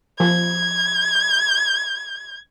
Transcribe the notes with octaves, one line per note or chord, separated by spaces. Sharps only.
F3 G#6